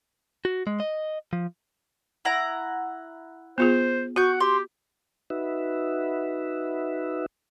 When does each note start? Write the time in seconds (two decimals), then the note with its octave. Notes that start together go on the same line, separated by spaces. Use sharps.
0.45 F#4
0.67 G#3
0.80 D#5
1.33 F3
2.25 E4 F#5 A#5
3.58 B3 F4 G#4 C5
4.16 F#4 F#5 C#6 G6
4.40 G4 C6
5.30 D#4 F#4 B4 E5